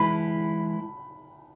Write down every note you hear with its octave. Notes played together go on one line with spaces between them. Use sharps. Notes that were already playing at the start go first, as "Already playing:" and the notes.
Already playing: E3 G#3 E4 B4 B5